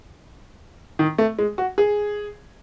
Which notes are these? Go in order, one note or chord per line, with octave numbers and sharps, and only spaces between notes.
D#3
A3
G#3
F#4
G#4